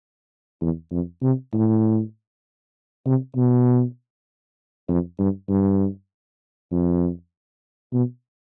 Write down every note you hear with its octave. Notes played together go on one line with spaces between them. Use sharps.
E2
F2
C3
A2
C3
B2
F2
G2
G2
F2
B2